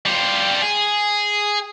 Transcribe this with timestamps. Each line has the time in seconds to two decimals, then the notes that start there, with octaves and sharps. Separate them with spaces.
0.06 G3 F4
0.62 G#4